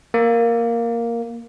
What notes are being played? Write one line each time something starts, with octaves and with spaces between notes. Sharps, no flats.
A#3